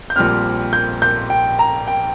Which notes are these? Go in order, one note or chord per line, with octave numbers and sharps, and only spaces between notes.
G6
A#1 A#2 G3 C4 F6
G6
G6
G5
A#5
G5